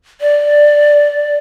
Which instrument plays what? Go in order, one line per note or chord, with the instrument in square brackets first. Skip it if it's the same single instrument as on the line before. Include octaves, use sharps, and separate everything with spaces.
[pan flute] D5